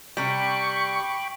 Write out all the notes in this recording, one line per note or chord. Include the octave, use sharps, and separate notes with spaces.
C3 G3 G5 B5 C#6 D6